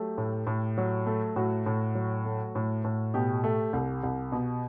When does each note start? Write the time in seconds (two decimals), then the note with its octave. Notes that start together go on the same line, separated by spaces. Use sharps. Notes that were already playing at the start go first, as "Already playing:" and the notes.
Already playing: F#3 A3 G4
0.18 A2
0.47 A2
0.78 F#3
1.06 A3
1.36 A2 F#4
1.66 A2
1.95 F#3
2.25 A3
2.55 A2
2.84 A2
3.14 B2 G4
3.44 A3
3.73 C2
4.04 C2
4.32 B2